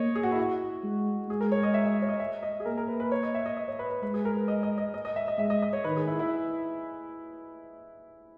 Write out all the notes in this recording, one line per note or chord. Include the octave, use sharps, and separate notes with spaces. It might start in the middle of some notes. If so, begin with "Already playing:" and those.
Already playing: A#3 C#5 D#5
G#4
F#4
E4
F#4
G#3
G#3 G#4
A#4
C#5
D#5
E5
E5
C#5
D#5
E5
D#5
G#4
A#3 A#4
A#4
B4
B4
C#5
D#5
E5
D#5
D#5
C#5
B4
B4
G#3 B4
G#4
A#4
B4
D#5
D#5
D#5
D#5
D#5
E5
D#5
G#3 E5
D#5
D#5
C#5
D#3 B4
G#4
E4
E4